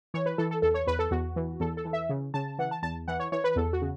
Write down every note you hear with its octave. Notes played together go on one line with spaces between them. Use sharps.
E3 C#5
B4
E3 A4
A4
E2 A4
C#5
E2 B4
A4
E2 F#4
E3
E2 A4
A4
E3
E5
C#3
C#3 A5
E3 F#5
A5
E2 A5
E3 F#5
C#5
E3 C#5
B4
E2 A4
F#4
C#3